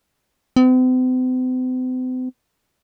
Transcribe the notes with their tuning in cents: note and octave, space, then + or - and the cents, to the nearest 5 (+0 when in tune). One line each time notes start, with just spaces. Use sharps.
C4 -45